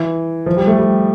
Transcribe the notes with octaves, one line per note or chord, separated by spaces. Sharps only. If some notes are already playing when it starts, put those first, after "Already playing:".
Already playing: E3
F3
G3
A3
G3